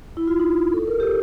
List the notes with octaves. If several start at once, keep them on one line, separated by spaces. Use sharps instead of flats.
E4
F4
D#4
A4
A#4
G4 A4